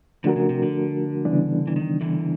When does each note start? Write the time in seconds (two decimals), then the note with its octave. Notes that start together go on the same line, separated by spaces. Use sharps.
0.24 D3 F3 A3 D4 F#4 A#4
0.36 C#3
0.49 C3
0.62 D3
1.25 C#3 E3 G3 B3 D4
1.67 E3
1.76 D#3
2.01 D3 E3